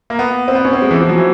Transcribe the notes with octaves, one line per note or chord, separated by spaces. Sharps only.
A#3
B3
C4
B3
C#4
C4
G#3
E3
F3
F#3
E3